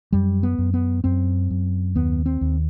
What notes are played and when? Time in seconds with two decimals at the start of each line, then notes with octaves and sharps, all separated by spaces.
0.13 F#2 G3
0.43 B3
0.58 F#2
0.74 B3
1.04 F#2 C4
1.50 F#2
1.95 D#2 B3
2.26 C4
2.41 D#2